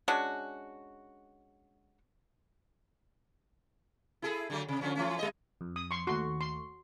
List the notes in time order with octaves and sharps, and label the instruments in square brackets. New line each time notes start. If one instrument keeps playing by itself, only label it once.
[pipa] G#3 C#4 D4 F#4
[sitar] E4 G#4 A4
D3 F#3 A3
C3
D3 F3 C#4
E3 A3 C#4
G3 D#5
[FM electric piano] F2
[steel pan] D#6
C6 C#6
[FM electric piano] D#2 A3 C#6 [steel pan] F#4 C6
[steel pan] C6